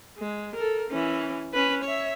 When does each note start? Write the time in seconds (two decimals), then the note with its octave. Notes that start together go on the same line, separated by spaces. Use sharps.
0.18 G#3
0.56 A4 A#4
0.91 E3 C#4
1.53 C#4 B4
1.84 C#5 E5